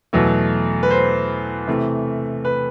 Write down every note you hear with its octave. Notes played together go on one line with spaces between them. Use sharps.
E2 B2 F#3 A3
B4
C5
C3 E3 A3
B4